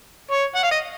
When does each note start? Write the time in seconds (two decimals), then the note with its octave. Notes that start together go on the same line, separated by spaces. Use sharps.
0.31 C#5
0.55 F#5
0.63 F5
0.71 D#5